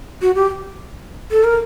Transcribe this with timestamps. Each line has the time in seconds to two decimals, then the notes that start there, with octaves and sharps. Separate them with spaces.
0.22 F#4
0.35 G4
1.31 A4
1.44 A#4